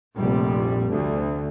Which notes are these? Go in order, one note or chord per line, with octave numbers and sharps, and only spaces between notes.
F1 A#1 G3
D2